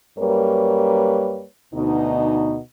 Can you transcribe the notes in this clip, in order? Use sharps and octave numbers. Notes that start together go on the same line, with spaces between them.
F#2 G3 A#3 A#4 B4 C#5
D2 B2 D#4